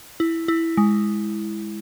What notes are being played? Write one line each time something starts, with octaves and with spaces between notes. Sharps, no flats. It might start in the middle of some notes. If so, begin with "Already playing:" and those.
E4
E4
G#3